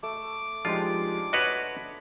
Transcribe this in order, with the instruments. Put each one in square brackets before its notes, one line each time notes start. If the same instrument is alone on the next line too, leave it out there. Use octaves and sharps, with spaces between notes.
[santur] A3 [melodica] D6
[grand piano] F3 G#3 G4 [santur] D4 D#4 C5 [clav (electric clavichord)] F4
[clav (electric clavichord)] F#4 B4 C#5 [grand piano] D#5 B6